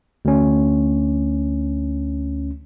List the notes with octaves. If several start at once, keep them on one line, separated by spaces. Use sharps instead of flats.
D2 C#4